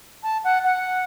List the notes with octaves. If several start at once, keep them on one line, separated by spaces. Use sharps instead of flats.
A5
F#5
F#5